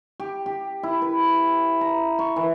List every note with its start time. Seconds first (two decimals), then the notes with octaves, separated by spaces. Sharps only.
0.20 G4
0.46 G4
0.83 E4
1.02 B4
1.81 A#5
2.19 C#6
2.36 E3